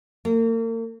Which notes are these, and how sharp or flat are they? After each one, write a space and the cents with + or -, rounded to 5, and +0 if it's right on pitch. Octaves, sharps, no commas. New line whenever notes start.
A#3 -40